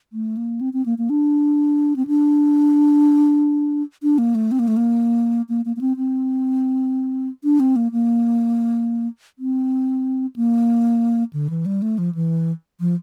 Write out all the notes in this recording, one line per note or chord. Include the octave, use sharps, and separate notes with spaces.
A3
A#3
C4
C4
A#3
A#3
D4
C4
D4
D4
A#3
A3
C4
A#3
A3
A#3
A#3
A#3
A#3
C4
C4
D4
C4
A#3
A#3
C4
A#3
D3
E3
G3
A3
F3
E3
F3